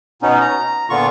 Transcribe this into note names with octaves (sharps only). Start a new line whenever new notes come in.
B2 B3 C#4 D#4
A#5
A#2 D3 B3 F4 C#6